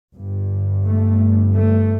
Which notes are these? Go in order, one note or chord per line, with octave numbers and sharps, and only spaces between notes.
G1 G2
A3
A3